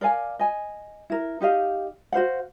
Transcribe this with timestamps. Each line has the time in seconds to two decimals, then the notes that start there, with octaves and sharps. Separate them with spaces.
0.01 A#4 D5 F5 G#5
0.39 D#5 G#5
1.10 E4 A#4
1.41 D#4 G4 D#5 F5
2.12 F#4 C5 F5 F#5